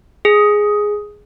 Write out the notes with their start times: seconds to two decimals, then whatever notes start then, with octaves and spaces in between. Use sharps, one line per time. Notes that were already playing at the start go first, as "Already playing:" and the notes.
0.25 G#4